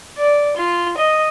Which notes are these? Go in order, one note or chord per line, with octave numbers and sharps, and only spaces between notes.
D5
F4
D#5